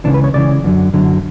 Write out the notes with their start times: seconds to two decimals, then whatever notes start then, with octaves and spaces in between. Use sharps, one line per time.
0.04 C#2 C#3 E3 D4
0.14 B4
0.24 C#5
0.34 C#2 C#3 E3 D5
0.64 F#2 D3 F#3
0.94 F#2 D3 F#3